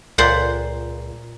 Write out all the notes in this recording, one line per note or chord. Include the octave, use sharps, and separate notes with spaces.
C#2 A#2 C5 F#5